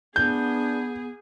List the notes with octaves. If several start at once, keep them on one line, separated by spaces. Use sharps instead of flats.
B3 D4 G#4 G6